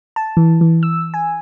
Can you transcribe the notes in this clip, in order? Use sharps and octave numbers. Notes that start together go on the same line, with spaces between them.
A5
E3
E3
E6
G#5